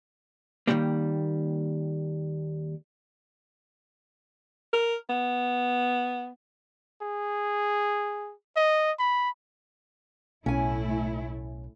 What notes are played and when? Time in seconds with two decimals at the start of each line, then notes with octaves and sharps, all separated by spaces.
0.67 D#2 D#3 E3 F#3 G3 A#3
4.73 A#4
5.10 B3
7.02 G#4
8.57 D#5
8.99 B5
10.46 B1 A2 A3 C#4 E4 G#5